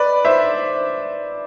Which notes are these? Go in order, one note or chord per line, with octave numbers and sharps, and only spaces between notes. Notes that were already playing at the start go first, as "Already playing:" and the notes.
Already playing: B4 D5
C5 E5